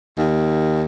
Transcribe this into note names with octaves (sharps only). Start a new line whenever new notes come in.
D#2